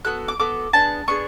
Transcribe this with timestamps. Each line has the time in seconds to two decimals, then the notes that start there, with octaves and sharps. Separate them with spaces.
0.05 B3 F#4 A4 F#6
0.28 D6
0.39 B3 F#4 A4 D6
0.73 B3 D4 G#4 A5
1.08 B3 D4 G#4 C#6